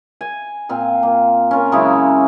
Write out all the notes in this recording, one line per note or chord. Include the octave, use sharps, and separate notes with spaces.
G#5
A#2 C4 F4
A#3
C#4 F4 A#4
C#3 F#3 G#3 E4